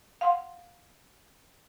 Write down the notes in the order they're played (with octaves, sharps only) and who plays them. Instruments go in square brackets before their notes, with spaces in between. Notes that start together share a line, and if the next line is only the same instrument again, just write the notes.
[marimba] F5 F#5 C6